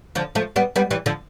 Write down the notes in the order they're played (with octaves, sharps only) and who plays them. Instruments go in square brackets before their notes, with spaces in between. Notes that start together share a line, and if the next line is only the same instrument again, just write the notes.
[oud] D3 F3
F3 A3
G3 B3
G3 B3
E3 G3
D3 F3